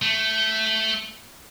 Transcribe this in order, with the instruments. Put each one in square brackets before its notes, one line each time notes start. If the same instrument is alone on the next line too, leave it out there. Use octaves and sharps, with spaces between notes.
[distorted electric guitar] A3